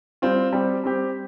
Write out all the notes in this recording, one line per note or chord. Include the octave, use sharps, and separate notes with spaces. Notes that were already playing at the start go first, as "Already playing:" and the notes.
G3 C4 F4
G3 C4 G4
G3 C4 G4